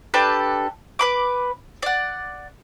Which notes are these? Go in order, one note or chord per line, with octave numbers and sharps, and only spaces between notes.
D4 G4 A4 B4
B4 B5 D6
D5 F#5